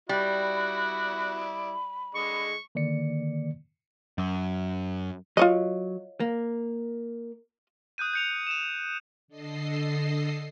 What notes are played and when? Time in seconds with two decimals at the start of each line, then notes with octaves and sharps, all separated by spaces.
0.09 G3 E4 F#4 D5 B5
2.15 D3 G#3 D#5 C#6
2.75 D3 D#3 A#3 D5 C#7
4.18 F#2
5.37 F#3 F4 C#5 D#5
6.20 A#3
7.98 D#6 F#6 G6 D#7
8.14 G6 C#7 F7
8.47 D#7 E7
9.28 D3 A4 D#5 C7